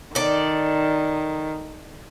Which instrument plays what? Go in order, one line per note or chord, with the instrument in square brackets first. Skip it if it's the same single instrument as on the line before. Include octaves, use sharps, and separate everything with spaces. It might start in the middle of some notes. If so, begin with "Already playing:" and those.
[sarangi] D#3 [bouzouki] A4 D5